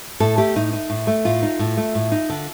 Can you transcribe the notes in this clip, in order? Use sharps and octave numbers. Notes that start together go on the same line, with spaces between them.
A2 A4
A3 G4
A2 D#4
D#4
A2
A3
A2 F4
D#4
A2
A3
A2
D#4
D3